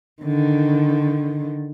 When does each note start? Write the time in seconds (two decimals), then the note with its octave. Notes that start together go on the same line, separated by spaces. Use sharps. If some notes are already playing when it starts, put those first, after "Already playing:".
0.23 D3 D#3